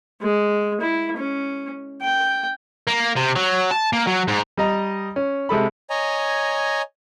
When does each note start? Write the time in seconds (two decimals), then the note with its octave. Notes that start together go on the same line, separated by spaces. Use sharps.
0.21 G#3
0.81 E4
1.17 C#4
2.01 G5
2.87 A#3
3.16 C3
3.36 F#3
3.71 A5
3.93 A#3
4.07 F#3
4.28 G#2
4.57 G3 D#5 A#5
5.16 C#4
5.49 C3 G#3 A4 B5
5.90 C#5 D#5 G#5 A#5